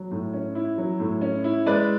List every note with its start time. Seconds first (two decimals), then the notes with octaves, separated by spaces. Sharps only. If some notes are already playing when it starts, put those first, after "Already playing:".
Already playing: F#3
0.11 A2
0.33 C#4
0.55 E4
0.78 F#3
1.00 A2
1.21 C#4
1.44 E4
1.66 G#3 B4 D5